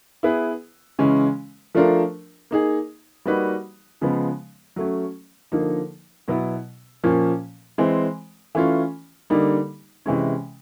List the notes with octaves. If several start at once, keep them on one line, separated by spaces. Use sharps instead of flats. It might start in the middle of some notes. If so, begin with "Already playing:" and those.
B3 E4 G#4 B4
C#3 E3 G#3 C#4
F3 A3 D4 F4 A#4
A#3 D#4 G#4
G3 A#3 D#4 F#4 B4
C#3 F3 G#3 B3
F#3 A3 C#4
D3 F3 A#3 D#4
B2 F#3 B3 E4
A#2 F3 A#3 C#4
E3 G#3 C4
E3 A3 C#4 F4
D3 G3 A#3 D#4
C3 E3 G#3 C#4